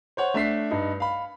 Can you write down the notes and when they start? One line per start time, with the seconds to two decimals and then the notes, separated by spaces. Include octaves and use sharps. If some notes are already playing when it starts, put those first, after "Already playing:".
0.17 C5 C#5 F#5
0.34 A3 D4 B6 C7
0.71 G2 D#4
1.00 F5 B5